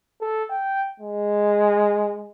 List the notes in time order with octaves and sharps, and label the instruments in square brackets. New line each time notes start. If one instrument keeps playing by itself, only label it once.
[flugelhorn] A4
G5
G#3